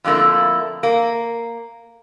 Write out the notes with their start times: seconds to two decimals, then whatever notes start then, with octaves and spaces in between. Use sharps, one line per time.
0.04 F2 D3 A3 A#3 E4
0.83 A#3